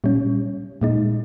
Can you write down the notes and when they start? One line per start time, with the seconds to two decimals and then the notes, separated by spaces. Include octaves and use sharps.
0.04 A#2 G3 C#4
0.81 A#2 G#3 D#4